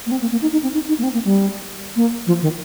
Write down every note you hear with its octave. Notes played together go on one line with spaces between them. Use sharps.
A#3
C4
A#3
A#3
D#4
D#4
C4
D#4
D#4
A#3
C4
A#3
G3
A#3
F3
D#3